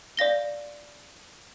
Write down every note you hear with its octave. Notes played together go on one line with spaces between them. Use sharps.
D5 F5 A#6 G7